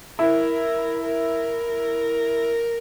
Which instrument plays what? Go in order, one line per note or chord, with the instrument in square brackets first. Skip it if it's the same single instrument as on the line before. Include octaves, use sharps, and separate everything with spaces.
[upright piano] E4 [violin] A#4
[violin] A#4